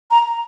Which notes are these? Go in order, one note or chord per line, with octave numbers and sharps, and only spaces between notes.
A#5